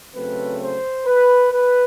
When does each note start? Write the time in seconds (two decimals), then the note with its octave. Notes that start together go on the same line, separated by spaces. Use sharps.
0.14 C#3 F#3 A3 C4 B4
0.61 C5
1.06 B4
1.52 B4